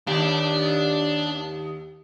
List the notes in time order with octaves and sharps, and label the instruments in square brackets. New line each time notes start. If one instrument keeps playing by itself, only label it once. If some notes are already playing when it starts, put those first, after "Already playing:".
[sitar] D#2 G4 [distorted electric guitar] D4